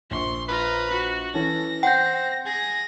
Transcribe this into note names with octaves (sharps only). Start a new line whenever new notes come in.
A#1 C6 C#6
F4 B4 A#5
F#4
E3 C#4 A4 A#6
C4 F#5 G5 G6
G#4 A#6